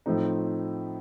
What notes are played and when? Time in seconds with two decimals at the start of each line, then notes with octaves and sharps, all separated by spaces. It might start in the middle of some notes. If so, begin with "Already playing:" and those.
0.06 A2 F3 A3 C4 D#4